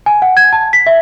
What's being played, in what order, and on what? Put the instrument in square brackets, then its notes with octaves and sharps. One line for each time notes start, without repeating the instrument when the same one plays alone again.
[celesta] G#5
F#5
G#6
A5
B6
E5